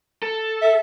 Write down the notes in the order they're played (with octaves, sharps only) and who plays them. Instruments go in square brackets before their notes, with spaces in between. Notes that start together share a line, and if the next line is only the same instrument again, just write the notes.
[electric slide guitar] A4
[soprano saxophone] E5